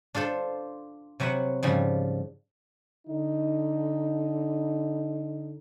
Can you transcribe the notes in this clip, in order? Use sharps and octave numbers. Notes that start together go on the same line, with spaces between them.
D4 F4 A4 C5
C3 F#3 B4 C5 F#5
G#2 C#3 F3 G3
D3 D#4